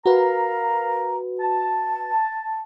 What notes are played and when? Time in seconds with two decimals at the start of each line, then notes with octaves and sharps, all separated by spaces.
0.06 F#4 A#4 B4 F5 A#5
1.40 A5